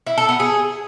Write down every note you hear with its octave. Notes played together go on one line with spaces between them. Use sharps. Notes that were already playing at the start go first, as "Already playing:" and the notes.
E4
A4
B3
G#4